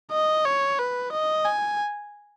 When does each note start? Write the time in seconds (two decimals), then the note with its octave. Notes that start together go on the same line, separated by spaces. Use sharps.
0.12 D#5
0.45 C#5
0.79 B4
1.12 D#5
1.45 G#5